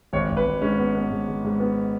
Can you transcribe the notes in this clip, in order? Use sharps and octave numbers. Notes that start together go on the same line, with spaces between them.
G#1 C#5
G#1
B4
G#1
G#2 C#4
B3
B3
G#2
G#2
G#2
B3